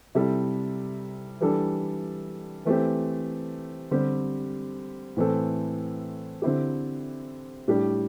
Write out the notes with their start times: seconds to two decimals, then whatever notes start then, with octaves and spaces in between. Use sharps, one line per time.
0.15 C3 G3 E4 A4
1.41 E3 G3 D4 A4
2.65 E3 A3 C4 G4
3.91 D3 G3 C4 G4
5.17 A2 E3 C4 A4
6.42 D3 C4 E4 G4
7.68 A2 G3 D4 G4